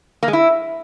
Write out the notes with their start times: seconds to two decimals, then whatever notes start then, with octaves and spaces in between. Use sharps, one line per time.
0.23 A#3
0.28 G#3
0.33 E4